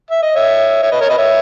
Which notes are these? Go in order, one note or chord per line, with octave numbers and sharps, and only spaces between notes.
E5
D#5
C#5 E5
C#5 E5
B4 D#5
A#4 C#5
B4 D#5
C#5 E5